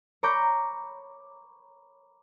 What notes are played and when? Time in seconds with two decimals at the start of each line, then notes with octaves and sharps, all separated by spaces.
0.23 C#5 A#5 B5 D6 G6 A#6